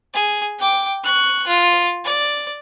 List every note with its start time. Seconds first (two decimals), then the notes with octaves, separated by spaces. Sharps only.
0.13 G#4
0.59 G5 D6
1.04 C#6 F#6
1.47 F4
2.04 D5